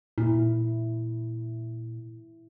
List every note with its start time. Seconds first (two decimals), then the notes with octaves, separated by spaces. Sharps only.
0.18 A#2 E4